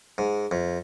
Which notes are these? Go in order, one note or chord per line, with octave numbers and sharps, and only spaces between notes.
G#2
F2